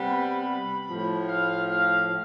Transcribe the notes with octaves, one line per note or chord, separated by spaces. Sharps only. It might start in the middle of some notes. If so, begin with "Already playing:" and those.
Already playing: C3 G3 B3
B5
A2 F3 A3
F5
F5